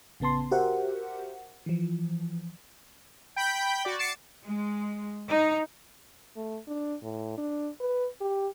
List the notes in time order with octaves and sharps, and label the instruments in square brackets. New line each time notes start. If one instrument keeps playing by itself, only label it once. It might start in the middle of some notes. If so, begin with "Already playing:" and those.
[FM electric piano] A1 C#3 B3 A5 C6
F#4 G4 A#4 C5 E5 F#5
E3 F3
[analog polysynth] G5 B5 G6 B6
F#4 D5
D6 A6 C7 C#7 E7
[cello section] G#3
D#4
[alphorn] A3
D4
A2
D4
B4
G4